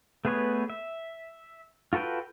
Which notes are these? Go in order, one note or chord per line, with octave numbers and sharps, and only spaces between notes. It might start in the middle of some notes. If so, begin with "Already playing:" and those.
A3 B3 G#4 B4 C#5
E5
F4 F#4 A4 B4 G5